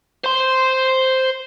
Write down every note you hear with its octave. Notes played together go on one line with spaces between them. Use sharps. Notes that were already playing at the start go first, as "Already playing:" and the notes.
C5 C6